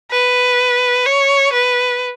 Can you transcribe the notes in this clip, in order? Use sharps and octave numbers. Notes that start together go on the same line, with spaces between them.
B4
C#5
B4